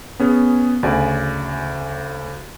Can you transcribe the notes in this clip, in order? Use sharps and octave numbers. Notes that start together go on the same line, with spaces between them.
B3 C#4 G#4
D2 C#3 D5 G#5